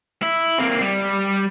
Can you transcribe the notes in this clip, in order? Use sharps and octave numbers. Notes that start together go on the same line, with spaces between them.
E4
A#3 C4
G3